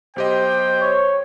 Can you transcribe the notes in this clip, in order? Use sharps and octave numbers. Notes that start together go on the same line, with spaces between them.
B1 G4 C5 D#5 G5
C#5